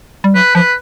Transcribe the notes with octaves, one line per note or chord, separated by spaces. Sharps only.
G3
F#3 B4
F3 B4